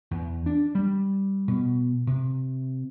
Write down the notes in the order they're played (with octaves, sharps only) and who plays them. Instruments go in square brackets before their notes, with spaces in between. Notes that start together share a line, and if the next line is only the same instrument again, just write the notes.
[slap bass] E2
D4
G3
B2
C3